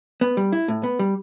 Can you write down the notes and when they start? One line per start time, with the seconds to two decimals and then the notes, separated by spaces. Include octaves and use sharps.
0.21 B3
0.37 G3
0.53 E4
0.68 A2
0.83 B3
0.99 G3